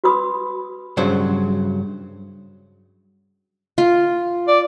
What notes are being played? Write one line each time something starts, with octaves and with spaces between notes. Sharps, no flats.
F#4 B4 B5 D#6
G2 C#3 F#3 C5
F4
D5